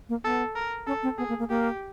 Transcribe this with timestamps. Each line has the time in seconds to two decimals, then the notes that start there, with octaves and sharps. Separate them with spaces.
0.09 A#3
0.24 B3 A4
0.55 A#4
0.87 C#4 A4
1.03 C4
1.18 B3 G#4
1.29 A#3
1.39 A#3
1.49 A#3 G4